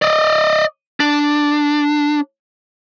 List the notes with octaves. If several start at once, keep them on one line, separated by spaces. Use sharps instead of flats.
D5 D#5
D4